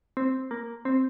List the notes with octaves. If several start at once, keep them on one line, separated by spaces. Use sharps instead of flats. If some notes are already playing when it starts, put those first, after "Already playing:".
C4
A#3
C4